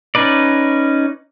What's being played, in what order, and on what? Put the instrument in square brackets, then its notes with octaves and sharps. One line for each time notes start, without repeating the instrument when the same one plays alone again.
[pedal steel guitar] C#4 D#4 B4 D5